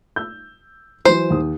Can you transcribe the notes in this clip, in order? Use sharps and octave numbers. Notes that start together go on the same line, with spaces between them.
E6 G6
E3 F#3 E4 C5
D#2 D#6